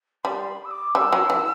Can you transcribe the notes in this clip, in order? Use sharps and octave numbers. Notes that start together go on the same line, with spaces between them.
G3 C6
B5
E6
D6
G3 E6
F#3
E3